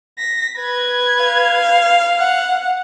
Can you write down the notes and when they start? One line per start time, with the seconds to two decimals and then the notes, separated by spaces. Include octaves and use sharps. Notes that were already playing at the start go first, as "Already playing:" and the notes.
0.18 A#6 B6
0.59 B4 G#6
1.24 F5
2.19 F#5